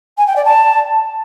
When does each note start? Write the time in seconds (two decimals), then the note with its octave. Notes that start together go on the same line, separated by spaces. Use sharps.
0.17 G#5
0.26 G5
0.36 D5
0.45 A5